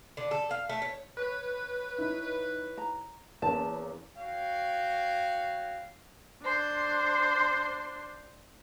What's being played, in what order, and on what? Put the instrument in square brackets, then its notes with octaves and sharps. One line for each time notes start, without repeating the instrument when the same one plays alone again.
[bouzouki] D3
A4
F5
A3
C#5
[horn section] B4 C#5
[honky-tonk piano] D#4 E4
[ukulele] A#5
[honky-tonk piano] E2 A#3 C#4 [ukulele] A5
[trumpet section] F#4 C#5 F5 G5
[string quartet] D4 C5 C6